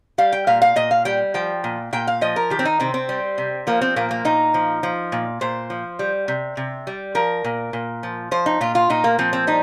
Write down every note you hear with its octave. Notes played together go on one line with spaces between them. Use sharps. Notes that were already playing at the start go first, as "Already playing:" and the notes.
G3 F5
G5
A#2 F5
F5
A#2 D#5
F5
G3 G5
F3 G5
A#2
A#2 G5
F5
F3 D#5
A#4
D#3 G4
C4
D#4
C3 C4
C4
G3
C3
F3 A#3
C4
A#2 A#3
A#3
A#2 D#4
F3
F3
A#2
A#2 C5
F3
G3
C3
C3
G3
F3 A#4
A#2
A#2
F3
F3 C5
D#4
A#2 F4
F4
A#2 D#4
A#3
F3 C4
C4
G3 D#4